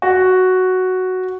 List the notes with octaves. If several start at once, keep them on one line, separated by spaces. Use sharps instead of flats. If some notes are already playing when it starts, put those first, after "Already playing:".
F#4